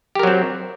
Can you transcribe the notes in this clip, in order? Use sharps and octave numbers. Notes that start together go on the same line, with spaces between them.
F#3 C4 G4 A#4